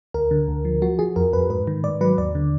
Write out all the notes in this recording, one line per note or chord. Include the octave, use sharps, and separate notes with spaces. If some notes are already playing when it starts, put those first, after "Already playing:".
D2 A#4
D3
D2
F3
F3 F#4
F3 G#4
F2 A#4
F2 B4
G#2 B4
D#3
G#2 D5
F#3 B4
D#2 D5
D3